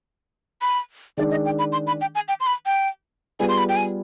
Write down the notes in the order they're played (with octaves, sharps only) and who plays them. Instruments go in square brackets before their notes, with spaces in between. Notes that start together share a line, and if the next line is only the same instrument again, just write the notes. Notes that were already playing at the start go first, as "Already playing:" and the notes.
[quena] B5
[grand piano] D#3 G#3 D4 [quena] D5
[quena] D#5
G5
B5
C6
B5
G5
G#5
G5
C6
B5
G5
[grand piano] G3 B3 F4 G#4 B4 [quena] G#5
[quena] C6
B5
G5
G#5